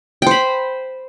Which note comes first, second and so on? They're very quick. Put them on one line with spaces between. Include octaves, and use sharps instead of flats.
G5 C5 B5